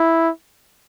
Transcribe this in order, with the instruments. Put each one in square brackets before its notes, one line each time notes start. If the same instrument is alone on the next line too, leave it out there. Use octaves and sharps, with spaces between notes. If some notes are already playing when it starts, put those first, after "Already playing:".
Already playing: [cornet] E4